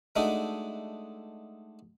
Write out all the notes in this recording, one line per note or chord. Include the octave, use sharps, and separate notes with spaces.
G#3 A3 D4 D#4 F#4